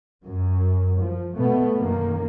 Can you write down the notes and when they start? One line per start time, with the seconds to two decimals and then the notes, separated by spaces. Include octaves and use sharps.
0.23 F#2
1.01 F3
1.36 B2 A3 B3
1.78 F#2 D#3 A#3